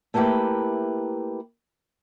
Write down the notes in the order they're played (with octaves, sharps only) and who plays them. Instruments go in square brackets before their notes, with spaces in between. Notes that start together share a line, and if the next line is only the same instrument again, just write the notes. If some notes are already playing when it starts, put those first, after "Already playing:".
[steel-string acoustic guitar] A3 A#3 E4 G4 B4 G5